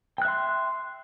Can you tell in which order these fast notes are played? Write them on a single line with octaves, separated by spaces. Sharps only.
G5 F#6 E5 C6